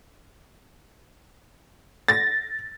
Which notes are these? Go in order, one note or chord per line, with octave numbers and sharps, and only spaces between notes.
A6 A#6